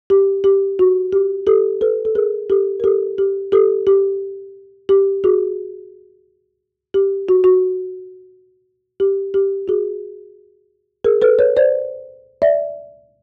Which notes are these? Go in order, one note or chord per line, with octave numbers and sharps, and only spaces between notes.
G4
G4
F#4
G4
G4 A4
A4 B4
A4
G#4 A#4
G4 A4
A#4
G4 A4
G4
G4 A4
G4
G4
F#4 G#4
G4
F#4
F#4
G4
G4
F#4 G#4
G#4 A#4
A4 B4
B4 C#5
C5 D5
D5 E5